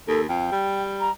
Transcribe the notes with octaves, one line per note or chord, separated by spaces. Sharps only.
D#2 A4
F2 G5
G3
A#5